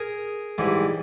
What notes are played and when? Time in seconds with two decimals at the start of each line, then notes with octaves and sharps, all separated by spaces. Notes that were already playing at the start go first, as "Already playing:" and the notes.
Already playing: G#4 A#4
0.58 G#2 E3 G3